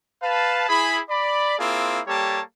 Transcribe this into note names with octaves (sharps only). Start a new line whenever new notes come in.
B4 F5 A5
E4 G#4 B5
D5 B5
A#3 C4 E4 F4 G#4
G3 A#3 G4 A4 C#5 A5